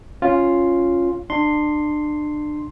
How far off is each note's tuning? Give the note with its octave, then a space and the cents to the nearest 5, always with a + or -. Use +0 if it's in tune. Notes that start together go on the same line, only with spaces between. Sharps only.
C#4 +0 F4 +0
D4 +30 C6 +0